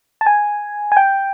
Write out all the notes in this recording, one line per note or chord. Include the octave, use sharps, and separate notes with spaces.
A5
G#5
G#5
G5